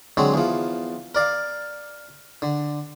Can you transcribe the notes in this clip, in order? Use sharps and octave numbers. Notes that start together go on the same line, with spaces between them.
D3 F#3 G#3 C4
E2 F3
A#4 D5 F5
D3